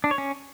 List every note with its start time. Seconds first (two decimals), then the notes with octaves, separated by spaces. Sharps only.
0.04 D4
0.11 C#5
0.18 C#4